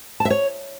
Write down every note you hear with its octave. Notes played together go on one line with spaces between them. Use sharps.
A5
E5
C#5